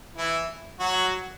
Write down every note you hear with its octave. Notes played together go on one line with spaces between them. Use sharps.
E3 E4
F#3 F#4